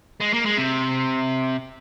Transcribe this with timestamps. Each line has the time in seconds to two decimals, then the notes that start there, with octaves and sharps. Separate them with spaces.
0.21 G#3
0.34 A#3
0.46 G#3
0.58 C3